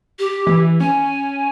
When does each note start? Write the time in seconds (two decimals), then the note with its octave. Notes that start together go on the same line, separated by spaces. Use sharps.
0.19 G4
0.47 E3
0.80 C#4 G#5